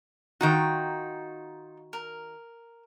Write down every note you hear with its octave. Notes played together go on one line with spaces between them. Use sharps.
D#3 D#4 F4 F#4 G5
A#4